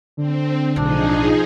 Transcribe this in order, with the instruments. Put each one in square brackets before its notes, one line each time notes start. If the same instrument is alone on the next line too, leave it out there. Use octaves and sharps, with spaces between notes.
[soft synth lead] D3 [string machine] C4
[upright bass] B1 A2 [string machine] F3 D#4 G#4 [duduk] D4